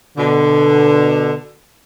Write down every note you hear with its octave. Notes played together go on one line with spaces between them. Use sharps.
B2 D3